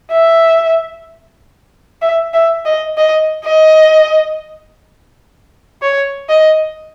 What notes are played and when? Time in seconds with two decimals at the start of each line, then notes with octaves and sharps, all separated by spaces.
0.12 E5
2.02 E5
2.34 E5
2.65 D#5
2.97 D#5
3.45 D#5
5.82 C#5
6.29 D#5